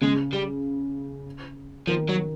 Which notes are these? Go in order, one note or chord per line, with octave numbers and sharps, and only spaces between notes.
C#3 G#3
G3
D#3 F3
F#3